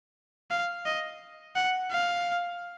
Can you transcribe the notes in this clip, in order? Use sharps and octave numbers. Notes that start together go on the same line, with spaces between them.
F5
D#5
F#5
F5